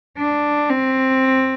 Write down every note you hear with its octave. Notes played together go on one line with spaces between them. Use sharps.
D4
C4